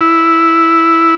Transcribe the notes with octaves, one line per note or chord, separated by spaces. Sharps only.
E4